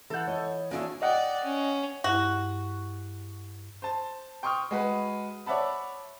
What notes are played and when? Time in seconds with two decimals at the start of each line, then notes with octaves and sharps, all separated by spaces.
0.10 E3 A4 F#5 G6
0.27 C#5 D#5
0.71 A#3 D4 E4 F#4 G#4 G#5
1.02 D5 D#5 F#5 G5
1.44 C#4
2.04 G2 E4 F#4
3.82 C5 A5
4.43 G5 C6 C#6 D#6 F6
4.71 G#3 F#4 B4
5.46 C#5 D5 E5 F#5 A5 B5